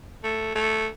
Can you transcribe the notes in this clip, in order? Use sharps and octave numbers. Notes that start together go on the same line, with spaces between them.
A3
A3